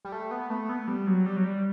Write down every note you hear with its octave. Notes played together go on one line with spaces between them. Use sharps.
G3
A3
B3
A3
B3
G3
F#3
G3
F#3
G3